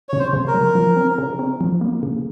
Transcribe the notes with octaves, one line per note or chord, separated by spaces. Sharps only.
C#3 C#5
C5
C#3
A#4
F#3
F3
C4
C#3
C4
F3
A#3
C#3